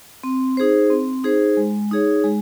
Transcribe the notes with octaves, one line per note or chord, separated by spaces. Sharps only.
C4
D#4 G#4 C5
C4
D#4 G#4 C5
G#3
D#4 G#4 C#5
G#3